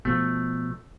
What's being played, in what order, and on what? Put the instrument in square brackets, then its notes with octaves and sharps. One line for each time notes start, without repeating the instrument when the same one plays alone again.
[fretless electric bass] B2 F3 [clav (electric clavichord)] A3